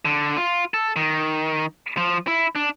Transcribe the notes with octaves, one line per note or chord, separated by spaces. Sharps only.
D3
F4
A4
D#3
F3
E4
D4